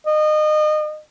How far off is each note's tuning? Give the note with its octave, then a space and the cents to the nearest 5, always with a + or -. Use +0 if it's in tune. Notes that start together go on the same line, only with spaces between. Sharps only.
D#5 -30